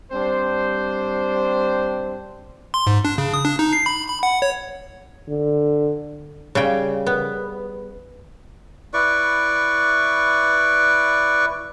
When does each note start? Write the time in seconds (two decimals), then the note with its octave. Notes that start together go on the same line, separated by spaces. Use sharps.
0.12 G3 C4 D4 C5
2.74 C6
2.87 G#2
3.05 D4
3.18 C#3
3.34 D#6
3.45 D4
3.59 D#4
3.73 C7
3.86 B5
4.08 B5
4.23 F#5
4.42 C#5
5.28 D3
6.55 C#3 G3 G5
7.06 B3
8.93 E4 B4 D5 C#6